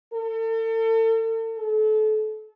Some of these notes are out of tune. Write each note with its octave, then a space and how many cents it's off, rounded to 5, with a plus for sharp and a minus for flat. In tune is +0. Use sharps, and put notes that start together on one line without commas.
A4 +40
A4 -30